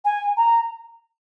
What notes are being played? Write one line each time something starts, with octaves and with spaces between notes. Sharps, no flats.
G#5
A#5